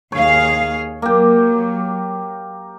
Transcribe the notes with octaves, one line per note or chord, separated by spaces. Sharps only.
D#2 G#4 C#5 F5
F#3 A#3 G4